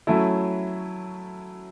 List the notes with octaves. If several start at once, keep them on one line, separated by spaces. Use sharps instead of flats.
F#3 A3 C#4 E4